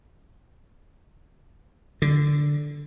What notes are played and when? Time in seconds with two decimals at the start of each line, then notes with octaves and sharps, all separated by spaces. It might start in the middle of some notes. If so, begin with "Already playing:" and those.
2.02 D3